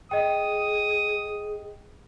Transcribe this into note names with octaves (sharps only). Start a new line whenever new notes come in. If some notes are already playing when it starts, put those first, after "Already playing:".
G#4 D#5 G5 D#6